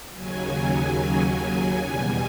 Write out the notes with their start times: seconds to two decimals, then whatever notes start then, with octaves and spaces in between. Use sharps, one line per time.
0.13 D#2 C#3 F#3 G#5
1.76 E2 B2 G3